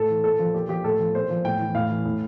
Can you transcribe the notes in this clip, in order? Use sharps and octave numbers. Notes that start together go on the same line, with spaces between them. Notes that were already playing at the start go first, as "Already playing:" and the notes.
Already playing: A2 A4
E3
A#2 A4
F3
A#2 G4
F3 G4
A2 A4
F3
A#2 C5
F3
A2 G5
E3
A2 F5
E3
A2